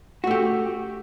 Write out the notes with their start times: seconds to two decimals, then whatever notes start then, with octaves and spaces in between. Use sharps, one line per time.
0.24 F#4
0.27 A3
0.31 G4